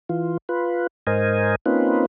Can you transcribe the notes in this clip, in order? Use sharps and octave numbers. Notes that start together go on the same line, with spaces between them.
E3 F4
F4 B4
G#2 A#4 C5 D#5 G#5
A#3 C4 C#4 D#4 F4 B4